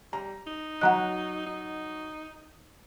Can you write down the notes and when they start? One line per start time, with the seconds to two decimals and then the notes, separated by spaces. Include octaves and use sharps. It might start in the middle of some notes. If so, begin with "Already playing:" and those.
0.13 G3 A#5
0.47 D#4
0.81 F#3 F#4 D#5 F#5 A#5 F#6
1.47 D#4